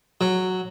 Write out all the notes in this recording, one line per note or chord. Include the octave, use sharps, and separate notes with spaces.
F#3